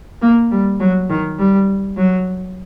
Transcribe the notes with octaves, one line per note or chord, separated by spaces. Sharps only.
A#3
G3
F#3
D#3
G3
F#3